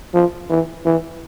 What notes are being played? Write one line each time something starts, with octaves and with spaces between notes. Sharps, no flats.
F3
E3
E3